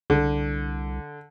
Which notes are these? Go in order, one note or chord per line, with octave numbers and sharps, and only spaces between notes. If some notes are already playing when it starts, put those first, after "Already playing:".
C2 D3